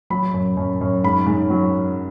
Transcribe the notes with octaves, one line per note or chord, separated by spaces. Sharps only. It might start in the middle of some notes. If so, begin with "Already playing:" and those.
F#3 B5
F#2
F#2
F#2
G#2 B5
G#2
F#3